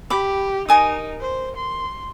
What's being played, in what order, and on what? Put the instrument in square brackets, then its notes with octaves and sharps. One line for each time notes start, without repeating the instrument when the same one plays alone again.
[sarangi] G4 [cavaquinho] B5 D6
[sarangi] D#4 [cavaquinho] A#4 G#5 D#6
[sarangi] C5
C6